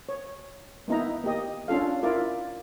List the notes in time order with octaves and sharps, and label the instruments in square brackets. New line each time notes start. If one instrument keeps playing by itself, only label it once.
[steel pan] C#5
A#3 B3 D#4 E4 A#5
A#3 G4 D#5
C#4 D4 F4 A4 F5
E4 F4 A#4 D5